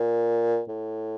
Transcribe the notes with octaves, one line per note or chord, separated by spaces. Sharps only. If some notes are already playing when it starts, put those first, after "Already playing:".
Already playing: A#2
A2